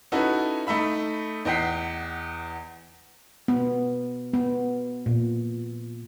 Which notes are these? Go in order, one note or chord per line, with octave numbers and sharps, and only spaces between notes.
C#4 D#4 E4 F#4 A4 B4
A3 D#4 E5 B5
E2 D#5 F#5 G5 B6 C7
B3
B3
A#2